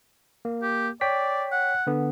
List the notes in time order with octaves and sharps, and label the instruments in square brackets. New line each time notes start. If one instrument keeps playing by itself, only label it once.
[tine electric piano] A#3
[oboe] G4
[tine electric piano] C#5 G5 B6 [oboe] D5
[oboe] F#5
[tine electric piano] D3 B3